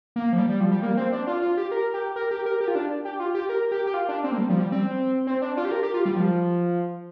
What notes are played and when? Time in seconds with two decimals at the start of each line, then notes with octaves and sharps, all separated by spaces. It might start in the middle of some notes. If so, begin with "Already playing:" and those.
0.16 A#3
0.33 F3
0.38 G3
0.49 G3
0.60 F3
0.72 G3
0.83 A#3
0.97 C4
1.12 D4
1.27 F4
1.42 F4
1.57 G4
1.71 A#4
1.94 G4
2.16 A#4
2.31 G4
2.46 A#4
2.60 G4
2.68 F4
2.75 D4
3.05 G4
3.20 F4
3.35 G4
3.49 A#4
3.71 G4
3.87 G4
3.94 F4
4.09 D4
4.24 C4
4.32 A#3
4.38 G3
4.49 F3
4.60 G3
4.72 C4
5.27 C4
5.42 D4
5.57 F4
5.65 G4
5.72 A#4
5.83 G4
5.94 F4
6.05 G3
6.16 F3